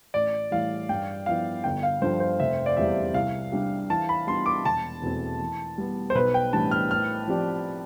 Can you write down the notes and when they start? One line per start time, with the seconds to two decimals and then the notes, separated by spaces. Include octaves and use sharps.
0.14 A1 D5
0.51 A2 E3 G3 F5
0.89 G2 G5
1.26 F3 B3 E4 F5
1.64 G1 G5
1.83 F5
2.02 G2 D3 F3 C5
2.20 C5
2.40 F1 E5
2.66 D5
2.77 E2 C3 G3 E5
3.14 C2 F5
3.52 C3 G3 D4 G4
3.90 E3 A5
4.09 B5
4.27 G3 B3 D4 F4 C6
4.46 D6
4.64 E1 A5
5.02 E2 B2 A3 C4
5.40 E3
5.78 G3 B3
6.10 C5
6.15 B1 B4
6.34 G5
6.53 A2 E3 G3 D4 A5
6.71 F6
6.90 A2 F6
7.27 F3 C4 G4 D5